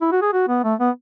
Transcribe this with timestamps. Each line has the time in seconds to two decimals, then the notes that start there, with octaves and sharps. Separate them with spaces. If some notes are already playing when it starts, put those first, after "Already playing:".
0.01 E4
0.12 F#4
0.21 G#4
0.33 F#4
0.48 B3
0.63 A3
0.79 B3